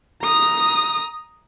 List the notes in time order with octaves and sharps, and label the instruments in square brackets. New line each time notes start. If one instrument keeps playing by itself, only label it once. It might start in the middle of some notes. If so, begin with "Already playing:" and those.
[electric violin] A#5 D#6